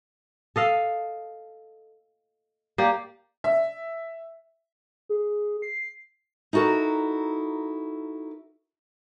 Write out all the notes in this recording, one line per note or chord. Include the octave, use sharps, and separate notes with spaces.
A4 D#5 F5
A#3 G4 D5
E5
G#4
C7
D#4 E4 F#4 A4 A#4